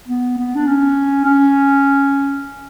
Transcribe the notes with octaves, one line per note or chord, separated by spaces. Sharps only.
B3
B3
D4
C#4
C#4